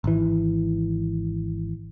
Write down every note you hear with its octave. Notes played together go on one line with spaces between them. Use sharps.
G#1 E3